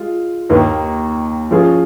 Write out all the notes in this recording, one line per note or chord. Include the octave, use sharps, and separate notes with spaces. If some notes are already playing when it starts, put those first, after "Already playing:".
Already playing: G#3 F4
D#2 D#3 A#3
F3 C#4 F4 G#4